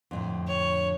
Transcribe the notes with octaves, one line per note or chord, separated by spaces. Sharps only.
F2 A2 D3
C#5